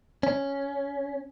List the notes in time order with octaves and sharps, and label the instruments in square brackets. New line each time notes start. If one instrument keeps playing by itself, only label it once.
[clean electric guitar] C#4